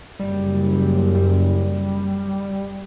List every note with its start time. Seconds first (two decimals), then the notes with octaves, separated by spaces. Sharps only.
0.19 F#1 G3
1.15 G3